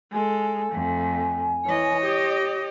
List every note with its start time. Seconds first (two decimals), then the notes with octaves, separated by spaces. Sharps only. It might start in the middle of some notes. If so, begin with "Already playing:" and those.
0.12 G#3 A4 G#5
0.72 F2 A3
1.66 E3 C#5 D#5
2.03 G4 D#6